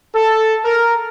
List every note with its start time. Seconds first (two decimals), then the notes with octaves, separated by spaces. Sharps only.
0.14 A4
0.65 A#4